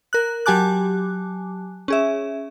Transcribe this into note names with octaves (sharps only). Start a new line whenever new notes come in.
A#4 F#6
F#3 G4 G#5 A5 D6 F#6
C#4 G#4 E5